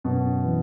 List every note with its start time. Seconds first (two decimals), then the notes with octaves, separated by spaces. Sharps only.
0.04 F#2 B2
0.44 E3